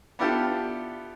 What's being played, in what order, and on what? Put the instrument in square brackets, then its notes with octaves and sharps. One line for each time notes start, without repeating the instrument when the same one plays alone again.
[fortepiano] B3 D4 E4 F4 G4 A4